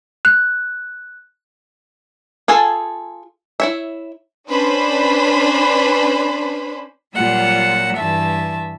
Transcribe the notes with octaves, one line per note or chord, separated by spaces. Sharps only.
F#6
F4 G#4 A4 G#5 A5
E4 C#5 E5
C#4 D4 B4 C5 B5
A#2 F#3 G3 F4 F#5 E6
G2 E3 E5 A5